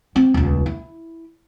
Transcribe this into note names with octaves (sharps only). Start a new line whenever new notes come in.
C4
D#1 C#2
E4